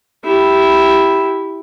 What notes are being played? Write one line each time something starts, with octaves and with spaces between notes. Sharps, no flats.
E4 G4